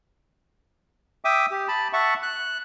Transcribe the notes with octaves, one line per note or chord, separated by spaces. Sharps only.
E5 G5 D6 D#6
G4
A5 B5
E5 F#5 A5 C#6
F#6